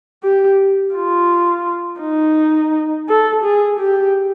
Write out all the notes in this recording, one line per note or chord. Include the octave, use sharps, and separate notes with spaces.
G4
F4
D#4
A4
G#4
G4